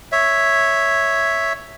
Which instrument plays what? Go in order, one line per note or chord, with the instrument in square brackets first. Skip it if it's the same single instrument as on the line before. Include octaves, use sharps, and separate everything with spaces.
[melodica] C#5 E5